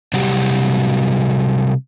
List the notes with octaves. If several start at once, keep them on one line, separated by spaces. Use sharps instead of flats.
C3 F#3 G3 F#4 G4